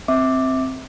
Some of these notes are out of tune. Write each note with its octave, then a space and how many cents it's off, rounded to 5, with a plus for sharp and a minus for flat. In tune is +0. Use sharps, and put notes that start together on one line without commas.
C4 +0 E5 -25 D6 +0